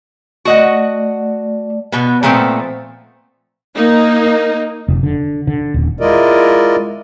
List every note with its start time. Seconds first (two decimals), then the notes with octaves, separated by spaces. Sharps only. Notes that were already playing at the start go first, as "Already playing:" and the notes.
0.45 A3 F#4 D5 D#5 F#5
1.92 B2 B3
2.23 A#2 F3 A3 B3 C4
3.75 A#3 D#4
4.88 F1
5.03 D3
5.47 D3
5.74 D#1
6.00 G#3 E4 F4 A#4 D5 D#5